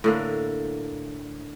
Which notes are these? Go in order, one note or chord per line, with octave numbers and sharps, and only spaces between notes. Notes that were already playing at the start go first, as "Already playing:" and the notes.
A2 D3 A#3